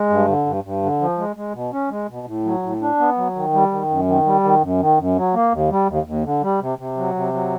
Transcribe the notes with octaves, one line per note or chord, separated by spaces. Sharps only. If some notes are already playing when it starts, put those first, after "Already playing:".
Already playing: G#3
G2
D3
G2
G2
D3
F3
G#3
G#3
B2
C#4
G#3
B2
A2
F#3
A2
D4
B3
F#3
D#3
G3
D#3
F#2
D#3
G3
D#3
F#2
D#3
F#2
F#3
A#3
D#2
G3
D#2
D#2
D3
G3
C3
C3
F#3
C3
F#3